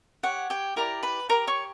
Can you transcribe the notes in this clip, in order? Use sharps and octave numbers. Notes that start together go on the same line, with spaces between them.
G4 C#5 F#5
G4 G5
E4 G4 A#4 D5 A#5
B4 B5
G4 A#4 C#5 A#5
C#5 C#6